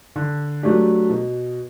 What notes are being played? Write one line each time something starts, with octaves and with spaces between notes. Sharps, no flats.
D3
F#3 A3 D4 G4
B2